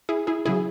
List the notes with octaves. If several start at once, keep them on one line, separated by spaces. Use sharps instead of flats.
E4 G#4
E4 G#4
C#3 F#3 E4 G#4